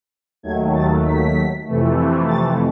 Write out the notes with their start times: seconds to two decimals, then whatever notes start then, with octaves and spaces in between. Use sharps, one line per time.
0.43 D#2 D#3 F#3 A3 G#6
0.74 A6
1.05 B6
1.66 F2 C3 E3 A3
2.28 A6